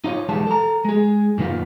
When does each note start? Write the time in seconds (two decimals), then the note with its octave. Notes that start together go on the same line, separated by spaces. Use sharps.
0.04 D#4 F4 C#5
0.29 B1 E2 G3 G#3 B3 A5
0.47 A4 A#5
0.85 G#3 G#4
1.38 F#2 A#2 D#3 B3 F4